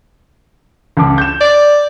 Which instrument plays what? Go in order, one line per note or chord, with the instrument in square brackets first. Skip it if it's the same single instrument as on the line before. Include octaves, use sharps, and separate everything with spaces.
[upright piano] C#2 A5 D6
G6 E7
[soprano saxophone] D5